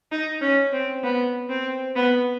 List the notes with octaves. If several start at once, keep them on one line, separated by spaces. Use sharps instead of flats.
D#4
C#4
C4
B3
C4
B3